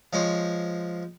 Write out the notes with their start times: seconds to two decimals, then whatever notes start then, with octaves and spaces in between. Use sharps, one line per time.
0.13 F3 G#3 C5 C#5